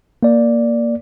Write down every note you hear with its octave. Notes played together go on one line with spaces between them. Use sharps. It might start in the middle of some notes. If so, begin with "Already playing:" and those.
A#3 D5